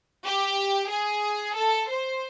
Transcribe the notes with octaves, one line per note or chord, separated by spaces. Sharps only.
G4
G#4
A4
C5